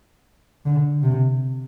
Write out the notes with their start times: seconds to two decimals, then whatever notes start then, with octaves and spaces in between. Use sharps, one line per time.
0.66 D3
1.03 C3